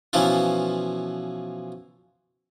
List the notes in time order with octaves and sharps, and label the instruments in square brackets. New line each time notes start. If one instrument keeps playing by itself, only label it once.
[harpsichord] B2 E3 F3 C#4 E4 F4